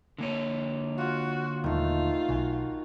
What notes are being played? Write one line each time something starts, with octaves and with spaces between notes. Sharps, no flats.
D3 A#3 C#5
F4 F#4 F#5
D#1 D#3 A3 F4
B1 F#4 G#5